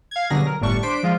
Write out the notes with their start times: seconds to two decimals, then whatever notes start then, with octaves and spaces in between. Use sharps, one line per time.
0.11 F5 G#6
0.30 G2 B2 D3 F#3 G#4 A#6
0.47 A#4
0.61 G1 A2 G3 D4 C#6
0.83 D4 C5 B6 D7
1.03 F3 G#3 F4